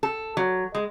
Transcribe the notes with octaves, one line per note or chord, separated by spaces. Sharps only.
A4
F#3
G#3